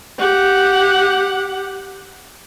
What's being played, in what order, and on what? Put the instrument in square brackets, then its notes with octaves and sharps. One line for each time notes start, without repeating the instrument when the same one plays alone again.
[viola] G4 F#5